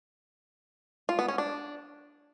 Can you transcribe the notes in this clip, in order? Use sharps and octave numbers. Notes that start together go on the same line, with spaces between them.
F4
B3
C#4
D4